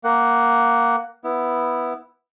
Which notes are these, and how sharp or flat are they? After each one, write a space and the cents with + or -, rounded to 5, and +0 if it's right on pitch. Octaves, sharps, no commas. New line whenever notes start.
A#3 +0 F#5 +10
B3 +0 E4 +0